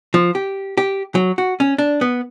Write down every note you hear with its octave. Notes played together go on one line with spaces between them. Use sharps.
F3
G4
G4
F#3
F#4
C#4
D4
B3